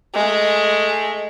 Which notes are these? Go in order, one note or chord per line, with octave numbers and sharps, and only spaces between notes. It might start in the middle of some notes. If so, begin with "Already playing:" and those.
G#3 A3